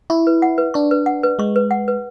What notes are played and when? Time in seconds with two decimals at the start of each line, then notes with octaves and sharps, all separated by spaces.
0.10 E4 C#6
0.27 B4
0.42 F#5
0.58 B4
0.74 D4 C#6
0.91 B4
1.06 F#5
1.23 B4
1.39 G#3 C#6
1.56 B4
1.71 F#5
1.88 B4